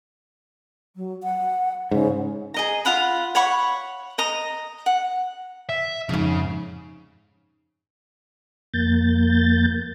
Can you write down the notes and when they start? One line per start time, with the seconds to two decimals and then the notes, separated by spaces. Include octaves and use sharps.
0.96 F#3
1.23 F#5
1.91 G#2 C#3
2.54 G#4 D#5 A#5
2.85 F4 F5 F#5 B5
3.35 C#5 F#5 B5 C#6
4.18 D#5 A#5 D#6
4.86 F#5
5.69 E5
6.09 F2 G#2 C#3
8.74 F2 A#3 G6 A6